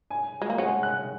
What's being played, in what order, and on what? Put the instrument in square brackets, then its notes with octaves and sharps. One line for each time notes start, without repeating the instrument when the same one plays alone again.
[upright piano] G#5
[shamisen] G#3
A#3
[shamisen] G#3 C#4 [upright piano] F#5
[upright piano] F#6